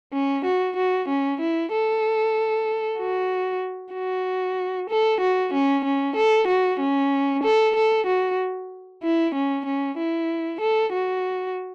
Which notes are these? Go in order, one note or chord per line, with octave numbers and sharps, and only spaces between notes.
C#4
F#4
F#4
C#4
E4
A4
F#4
F#4
A4
F#4
C#4
C#4
A4
F#4
C#4
A4
A4
F#4
E4
C#4
C#4
E4
A4
F#4